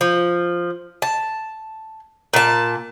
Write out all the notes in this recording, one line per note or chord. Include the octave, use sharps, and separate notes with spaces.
F3
A5
A#2 A5